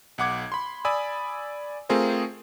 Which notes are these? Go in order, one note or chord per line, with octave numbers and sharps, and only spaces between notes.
B1 F#5 D6 G#6
B5 C6
D5 G#5 B5 D#6 E6
A3 C4 F4 G#4 A#4 C5